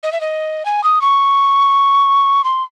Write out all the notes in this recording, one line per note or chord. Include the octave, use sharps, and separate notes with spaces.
D#5
E5
D#5
G#5
D#6
C#6
C6